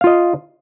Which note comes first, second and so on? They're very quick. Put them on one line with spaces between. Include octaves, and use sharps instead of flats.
F5 F4 D#5